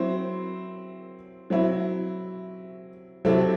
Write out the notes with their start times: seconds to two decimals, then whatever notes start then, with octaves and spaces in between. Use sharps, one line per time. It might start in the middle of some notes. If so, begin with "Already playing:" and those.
Already playing: F#3 C4 E4 C5
1.50 F#3 C4 E4
3.25 C3 F#3 C4 E4 A4